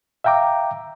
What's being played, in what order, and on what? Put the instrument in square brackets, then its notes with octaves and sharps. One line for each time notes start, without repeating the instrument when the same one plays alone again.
[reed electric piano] E5 F5 G5 A#5 D6